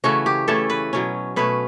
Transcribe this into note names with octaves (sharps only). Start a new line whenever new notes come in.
C#3 E3 A3 C#4 F#4
G4
C#3 E3 A3 C#4 A4
B4
B2 F#3 C#4
B2 A3 C#4 B4